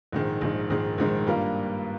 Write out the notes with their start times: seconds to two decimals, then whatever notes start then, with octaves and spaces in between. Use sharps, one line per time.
0.12 A#1 G#2 D#3 G#3
0.41 A#1 G#2 D#3 G#3
0.70 A#1 G#2 D#3 G#3
0.98 A#1 G#2 D#3 G#3
1.27 G2 G3 A#3 F4 A#4